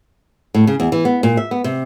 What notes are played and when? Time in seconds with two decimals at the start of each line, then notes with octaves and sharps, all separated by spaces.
0.54 A2
0.67 C#3
0.80 E2
0.92 E3
1.05 B3
1.23 A#2
1.37 E5
1.51 B3
1.64 C3